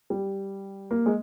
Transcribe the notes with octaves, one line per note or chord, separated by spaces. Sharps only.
G3
A#3
G#3